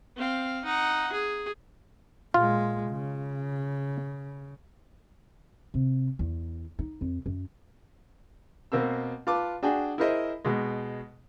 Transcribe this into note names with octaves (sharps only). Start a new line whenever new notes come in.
C4 F5
D#4 F#5
G#4
A#2 G#3 F4
C#3
C3
E2
D#4
F2
F#2
B2 A#3 C4 E6
F4 B4 A5 D6
D4 F#4 G#4 G5 G#5
E4 G#4 A#4 C5 D#5 E5
B2 G#3